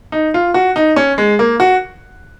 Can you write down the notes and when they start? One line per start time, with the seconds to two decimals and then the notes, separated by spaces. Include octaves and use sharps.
0.12 D#4
0.34 F4
0.54 F#4
0.76 D#4
0.96 C#4
1.18 G#3
1.39 A#3
1.60 F#4